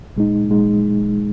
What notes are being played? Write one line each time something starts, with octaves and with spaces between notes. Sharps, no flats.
A#2 G#3 D#4
A#2 G#3 D#4